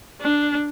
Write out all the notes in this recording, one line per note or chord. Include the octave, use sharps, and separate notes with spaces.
D4